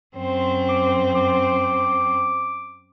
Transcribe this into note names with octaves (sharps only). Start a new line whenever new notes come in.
F#2 C4 C5
D6
D6